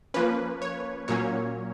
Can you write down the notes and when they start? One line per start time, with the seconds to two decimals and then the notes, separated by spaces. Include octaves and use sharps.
0.14 F3 A#3 C#4 B4
0.62 C#5
1.08 A#2 F#3 A#3 C#4 C#5